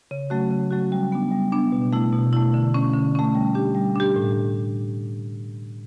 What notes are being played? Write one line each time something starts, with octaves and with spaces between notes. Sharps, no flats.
C#3
F#3 A3 C#4 F#4
C#3
F#3 A3 C#4 F#4
G3
B3 D4
G3
B3 D4
B2
A3 E4
B2
A3 E4
D3
A3 C#4
D3
A3 C#4
G3
D4 G4
G3
D4 G4
A2